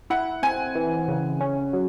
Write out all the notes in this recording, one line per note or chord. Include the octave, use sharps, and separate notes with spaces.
E4 F#5
C4 G#5
E3
C#3
C#4
F#3